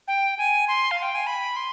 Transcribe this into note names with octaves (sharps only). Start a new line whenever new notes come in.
G5
G#5
C6
F5
G5
G#5
B5
C6